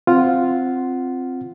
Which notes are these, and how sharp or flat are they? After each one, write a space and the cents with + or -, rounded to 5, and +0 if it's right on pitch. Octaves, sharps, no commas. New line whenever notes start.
C4 +0 F4 +0 F#5 +0